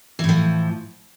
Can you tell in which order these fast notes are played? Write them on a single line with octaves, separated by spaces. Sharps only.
E3 A2 F3